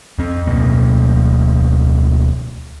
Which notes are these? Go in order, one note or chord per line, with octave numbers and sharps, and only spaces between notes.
F2 C4
D1 D2 B2 A#3